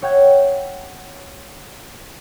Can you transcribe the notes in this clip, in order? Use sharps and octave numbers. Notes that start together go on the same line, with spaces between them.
C#5 E5 F#5 G5 G6 G#6